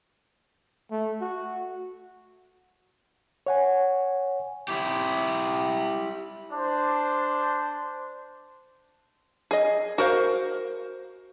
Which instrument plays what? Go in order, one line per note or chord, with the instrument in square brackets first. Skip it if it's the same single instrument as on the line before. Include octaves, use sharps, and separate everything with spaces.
[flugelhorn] A3
F#4
[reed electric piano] C#5 F#5 G#5
[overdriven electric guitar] E4 G4
[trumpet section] D4 C5
[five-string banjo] G#4 D#5
F#4 A#4 C5 F5